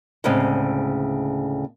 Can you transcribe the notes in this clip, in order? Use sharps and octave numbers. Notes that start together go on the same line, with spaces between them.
D2 A2 C#3 G#3 C4